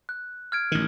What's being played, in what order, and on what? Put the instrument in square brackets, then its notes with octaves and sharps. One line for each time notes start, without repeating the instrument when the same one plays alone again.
[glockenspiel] F#6
F6 G#6 D7
[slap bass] A1 D#3